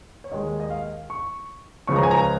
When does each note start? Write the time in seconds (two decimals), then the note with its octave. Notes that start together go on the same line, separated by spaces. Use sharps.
0.24 C#5
0.31 D#2 D#3 G#3 D#5
0.60 D#5
0.70 F5
1.10 C#6
1.87 C#2 C#3 F3 G#3 C#6
1.96 A#5
2.03 G#5
2.11 A#5